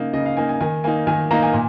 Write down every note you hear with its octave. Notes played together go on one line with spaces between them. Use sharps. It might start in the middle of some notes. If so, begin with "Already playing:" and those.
Already playing: C#3 A#3 D#4
C#3 D#5
F5
A#3 D#4 G#5
G#5
D#3 G#5
A#3 D#4 G#5
D#3 G#5
A#3 D#4 A#5
G#5
A#2